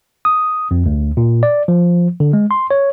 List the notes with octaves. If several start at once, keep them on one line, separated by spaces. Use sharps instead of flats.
D#6
F2
D2
A#2
D5
F3
D3
G#3
C6
C#5